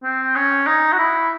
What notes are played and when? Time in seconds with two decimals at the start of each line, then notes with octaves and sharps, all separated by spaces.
0.04 C4
0.36 C#4
0.67 D#4
0.92 F#4
0.98 E4